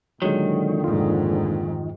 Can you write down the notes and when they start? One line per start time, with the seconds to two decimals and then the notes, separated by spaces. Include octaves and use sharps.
0.22 A#2 D3 D#3 F#3 G#3
0.84 F1 G#2 F4